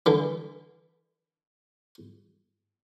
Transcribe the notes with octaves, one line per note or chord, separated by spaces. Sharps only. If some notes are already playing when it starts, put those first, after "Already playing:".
D3 E3